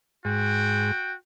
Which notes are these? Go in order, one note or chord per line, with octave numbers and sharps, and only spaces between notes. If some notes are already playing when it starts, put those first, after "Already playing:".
G#2 F#4 G5